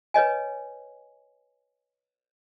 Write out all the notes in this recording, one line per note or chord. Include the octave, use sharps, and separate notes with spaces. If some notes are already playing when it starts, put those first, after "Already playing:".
B4 C#5 D#5 G#5